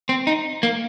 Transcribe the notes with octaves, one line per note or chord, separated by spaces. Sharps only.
C4
D#4
A#3